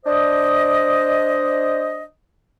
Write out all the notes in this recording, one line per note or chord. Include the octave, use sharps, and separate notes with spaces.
D4 C5 D#5